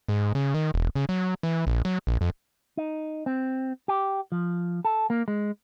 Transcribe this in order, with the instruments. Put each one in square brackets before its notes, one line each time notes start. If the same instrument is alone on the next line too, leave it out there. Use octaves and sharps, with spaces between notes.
[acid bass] G#2
C#3
D#3
E1
C#3
F#3
E3
A#1
F#3
A#1
F2
[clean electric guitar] D#4
C4
G4
F3
A4
A#3
G#3